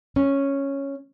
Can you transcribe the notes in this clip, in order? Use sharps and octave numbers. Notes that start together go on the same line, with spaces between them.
C#4